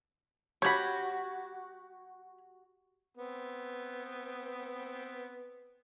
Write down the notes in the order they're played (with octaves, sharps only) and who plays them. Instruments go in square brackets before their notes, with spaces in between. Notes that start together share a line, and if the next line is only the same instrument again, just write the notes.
[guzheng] F#4 G4 [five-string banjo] C#5 B5
[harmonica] B3 C4